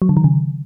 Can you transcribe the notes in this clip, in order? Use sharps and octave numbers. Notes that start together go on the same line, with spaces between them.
F#3
D3
D#3
C#3